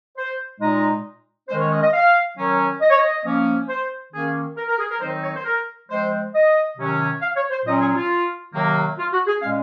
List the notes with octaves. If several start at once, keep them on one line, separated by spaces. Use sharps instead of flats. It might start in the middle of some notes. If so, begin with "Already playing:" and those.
C5
A#2 G#3 D#4 D#5
D#3 G#3 C#4 C5
C#5
D#5
D#5
F5
D#3 F#3 C#4
D#5
C#5
D#5
F3 A#3 C#4
C5
D#3 A#3 C#4 G#4
A#4
A#4
G#4
A#4
D#3 F#3 C4 D#4 C5
C#5
C5
A#4
F3 G#3 C4 C5
D#5
C3 D#3 F#3 C#4
F5
C#5
C5
A#2 F#3 C#4 D#5
G#4
F4
C3 D#3 F#3 A#3
F4
F#4
G#4
A#2 G#3 C#4 F5